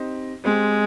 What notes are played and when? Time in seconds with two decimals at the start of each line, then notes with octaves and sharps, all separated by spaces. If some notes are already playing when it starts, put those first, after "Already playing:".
Already playing: C4 D#4 G4 C5 D#5
0.45 G#3 C4 G4 C5